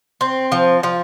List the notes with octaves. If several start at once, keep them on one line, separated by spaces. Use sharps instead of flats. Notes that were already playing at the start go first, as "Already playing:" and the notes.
C4
F3
F3